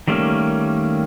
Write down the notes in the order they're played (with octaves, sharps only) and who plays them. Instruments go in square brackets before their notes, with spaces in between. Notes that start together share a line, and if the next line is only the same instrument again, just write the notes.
[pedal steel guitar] D#3 G3 A3 A#3 C#4